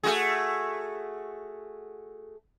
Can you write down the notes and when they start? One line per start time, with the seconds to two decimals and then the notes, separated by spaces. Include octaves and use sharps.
0.03 A3 F#4 G#4